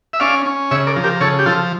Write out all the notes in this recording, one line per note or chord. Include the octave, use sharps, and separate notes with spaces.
E5
C#4 D5 F5
C#4
C#3 C#5 E5
A#4 D5
F3
G4 A#4
C#3 A4 C#5
G4
F3 F4 A4